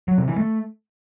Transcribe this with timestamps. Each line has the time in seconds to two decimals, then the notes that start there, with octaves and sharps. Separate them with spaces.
0.08 F#3
0.18 C3
0.28 E3
0.38 A3